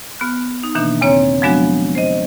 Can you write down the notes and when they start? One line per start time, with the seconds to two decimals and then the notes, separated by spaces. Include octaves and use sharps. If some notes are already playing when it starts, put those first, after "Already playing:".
0.19 B3 F6 F#6
0.63 D#4
0.75 B2 D#3 E3 A#3 D4
1.01 E2 C#3 C4 C#5 A#5
1.42 F3 F#3 G#3 B3 D4 F#4
1.95 C5 D#5